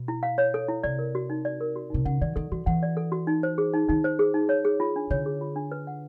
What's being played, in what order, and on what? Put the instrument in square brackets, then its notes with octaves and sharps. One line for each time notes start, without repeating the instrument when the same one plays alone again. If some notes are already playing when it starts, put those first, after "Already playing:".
Already playing: [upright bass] B2
[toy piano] E4
F5
C#5
A4
E4
[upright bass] C3 [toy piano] D5
[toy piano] A#4
F#4
D#4
D5
A#4
F#4
[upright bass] C3 [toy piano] D#4
[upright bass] C#3 [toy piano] F#5
[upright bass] D#3 [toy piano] D5
[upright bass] D#3 [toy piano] A4
[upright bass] E3 [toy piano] F#4
[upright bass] E3 [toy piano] F#5
[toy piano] D5
A4
F#4
D#4
C5
G#4
D#4
[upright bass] D#3 [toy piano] D#4
[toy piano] C5
G#4
D#4
C#5
G#4
F4
D4
[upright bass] D3 [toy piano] C#5
[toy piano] G#4
F4
D4
B4
F#5